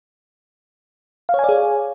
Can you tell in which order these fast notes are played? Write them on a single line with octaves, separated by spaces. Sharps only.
F5 C#5 G#5 D5 G#4